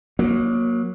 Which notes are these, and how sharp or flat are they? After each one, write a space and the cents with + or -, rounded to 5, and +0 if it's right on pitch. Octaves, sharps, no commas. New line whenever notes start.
F#3 -15 A#3 +15